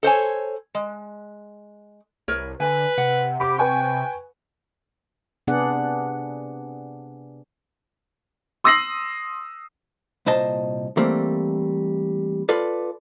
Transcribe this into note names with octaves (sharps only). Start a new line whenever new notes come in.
A4 C5 C#5 G#5
G#3
C2 A#4 B4 C#5
D3 B4 G#5
C3 F#5
C3 G4 B5 D6
B4 G5 G#5 C#6
C3 B3 D4 G#4 D5 F#5
C6 D#6 E6 A#6 C7 F#7
C2 A#2 C5 D#5 A5
E3 G3 A3 A#3 C4
F4 A4 B4 D5